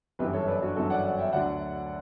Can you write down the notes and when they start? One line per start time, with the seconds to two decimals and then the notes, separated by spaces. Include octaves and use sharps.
0.19 G1 F#2 E3 G4 B4
0.33 A4 C#5
0.47 B4 D5
0.62 D4 F#4
0.76 G1 F#2 E3 F#4 A4
0.90 D5 F#5
1.04 D5 F#5
1.18 E5 G5
1.33 D2 D3 F#3 D5 F#5